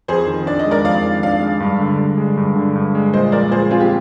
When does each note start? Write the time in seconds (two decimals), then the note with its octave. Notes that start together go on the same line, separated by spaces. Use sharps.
0.08 F2 G#4 C5
0.27 D#3
0.46 D4 D5
0.59 D#5
0.66 G#3
0.71 A#4 D5
0.84 F2 D5 F5
1.04 D#3
1.23 D4 D5 F5
1.42 G#3
1.60 G2
1.80 D3
1.99 G2
2.18 G#3
2.37 G2
2.56 D3
2.75 G2
2.95 G#3
3.13 A#2 C5 D#5
3.32 F3 A#4 D5
3.51 A#2 G#4 C5
3.70 C4 F4 G#4
3.81 G4